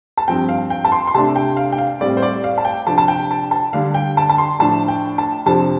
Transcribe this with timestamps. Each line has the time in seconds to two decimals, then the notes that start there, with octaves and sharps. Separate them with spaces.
0.18 A5
0.28 G2 F3 C4 G5
0.49 F5
0.70 G5
0.85 A5
0.92 C6
1.07 C6
1.14 C3 A3 D4 A5
1.36 G5
1.57 F5
1.72 G5
1.78 F5
2.00 A2 G3 C4 D5
2.17 C5
2.22 D5
2.44 F5
2.58 A5
2.65 G5
2.87 C3 F3 D4 A5
2.98 A5
3.08 G5
3.31 A5
3.51 A5
3.73 D3 G3 D4 F5
3.94 G5
4.17 A5
4.29 A5
4.38 C6
4.59 A2 F3 D4 A5
4.88 G5
5.18 A5
5.46 F2 C3 F3 D4 A5